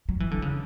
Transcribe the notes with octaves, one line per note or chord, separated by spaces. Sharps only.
F#3
E3
D3
C#3